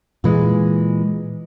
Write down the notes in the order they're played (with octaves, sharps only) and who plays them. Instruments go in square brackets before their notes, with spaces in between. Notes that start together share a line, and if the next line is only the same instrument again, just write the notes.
[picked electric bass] A#2 E3 G#3